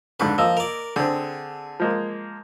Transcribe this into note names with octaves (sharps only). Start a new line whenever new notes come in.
F2 G#2 D3 B4
F3 A#3 D#5 E6
A#4 D5
D3 C4 G#4
F3 G#3 A#3